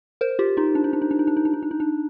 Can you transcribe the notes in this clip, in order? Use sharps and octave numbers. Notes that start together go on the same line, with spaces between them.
A#4 C5
F4 G4
D#4 F4
D4
D#4
D4
D#4
D4
D#4
D4
D#4
D4
D#4
D4
D#4
D4